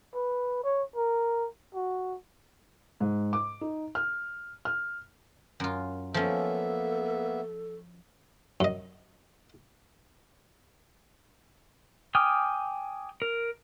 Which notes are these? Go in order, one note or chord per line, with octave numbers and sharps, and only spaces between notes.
B4
C#5
A#4
F#4
G#2
D6
D#4
F6
F6
F#2 F4
F3 A#3 B3 C#4 A4 E5
F#2 D#5
G5 G#5 D6 D#6 F6
A#4